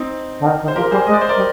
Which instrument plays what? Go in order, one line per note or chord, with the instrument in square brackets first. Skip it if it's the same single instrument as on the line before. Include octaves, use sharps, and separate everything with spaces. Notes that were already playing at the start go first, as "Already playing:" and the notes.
Already playing: [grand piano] C4 D#4
[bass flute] D3
D#3
D#3
[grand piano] C5
[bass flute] F3 [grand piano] G4 A#4
[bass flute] G3 [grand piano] G#4 C5
[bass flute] G#3 [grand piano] D#5
[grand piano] D5
C5
A#4 D5
[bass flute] G3